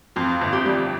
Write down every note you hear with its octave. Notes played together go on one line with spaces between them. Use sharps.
F2 F4
G1
G4
G3